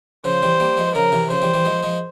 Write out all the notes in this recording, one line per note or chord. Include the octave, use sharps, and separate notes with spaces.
C#3 F3 C5
E3 G3
G3 A#3
F3 G#3
C#3 F3 A#4
C3 E3
C#3 F3 C5
E3 G3
E3 G3
F3 G#3
F3 G#3